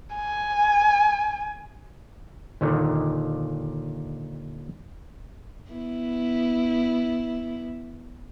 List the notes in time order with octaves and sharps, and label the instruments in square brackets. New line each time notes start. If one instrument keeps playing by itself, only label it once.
[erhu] G#5
[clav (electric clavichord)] D#2 A#2 D3 D#3
[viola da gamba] B3 E4